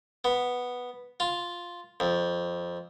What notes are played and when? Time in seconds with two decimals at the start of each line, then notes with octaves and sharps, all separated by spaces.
0.24 B3
1.20 F4
2.00 F2